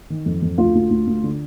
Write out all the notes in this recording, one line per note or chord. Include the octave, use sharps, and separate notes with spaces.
D#3
F2
F2
D2 F4
D2
D2
D2
D3